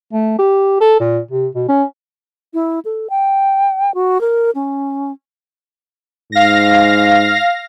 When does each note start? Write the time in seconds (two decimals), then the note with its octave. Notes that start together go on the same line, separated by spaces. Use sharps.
0.13 A3
0.39 G4
0.81 A4
1.00 A#2
1.31 C3
1.55 B2
1.69 C#4
2.54 E4
2.85 A4
3.10 G5
3.94 F#4
4.21 A#4
4.55 C#4
6.32 G#2 F5 A#6